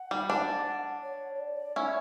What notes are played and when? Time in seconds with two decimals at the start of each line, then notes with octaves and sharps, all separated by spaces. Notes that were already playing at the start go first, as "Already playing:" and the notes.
Already playing: F#5
0.11 G3
0.30 D4
1.03 C#5
1.35 C#5
1.40 D5
1.76 C#4 E4 E5